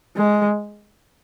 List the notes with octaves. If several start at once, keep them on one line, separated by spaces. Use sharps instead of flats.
G#3